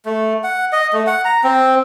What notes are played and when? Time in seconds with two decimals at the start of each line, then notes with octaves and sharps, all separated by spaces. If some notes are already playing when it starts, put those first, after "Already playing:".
0.05 A3
0.44 F#5
0.72 D#5
0.93 A3
1.07 F#5
1.25 A#5
1.43 C4